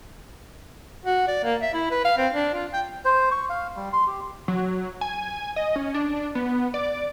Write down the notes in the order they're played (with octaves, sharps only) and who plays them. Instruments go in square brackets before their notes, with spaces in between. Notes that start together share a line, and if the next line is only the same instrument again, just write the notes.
[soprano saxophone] F#4
D5
A#3
E5
E4
B4
F5
C4
D4
F4
G5
[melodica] C5
C#6
F5
G3
C6
G4
[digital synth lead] F#3
G#5
D#5
C#4
D4
B3
D5